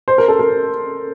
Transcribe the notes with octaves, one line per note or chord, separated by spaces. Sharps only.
C5
A#4
A4
A#4